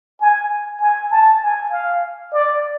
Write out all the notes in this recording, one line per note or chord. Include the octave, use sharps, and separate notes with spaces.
G#5
G#5
A5
G#5
F5
D5